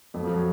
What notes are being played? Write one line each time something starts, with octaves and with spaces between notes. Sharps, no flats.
F2 F#3
F3
F#3